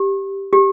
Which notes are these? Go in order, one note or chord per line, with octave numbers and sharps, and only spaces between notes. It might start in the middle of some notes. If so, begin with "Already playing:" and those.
Already playing: G4
G4